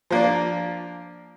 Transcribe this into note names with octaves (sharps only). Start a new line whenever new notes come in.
F3 A#3 D4